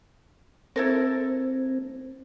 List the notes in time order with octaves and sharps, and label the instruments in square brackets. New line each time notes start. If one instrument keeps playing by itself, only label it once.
[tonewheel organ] C4 [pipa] E4 A4 A#4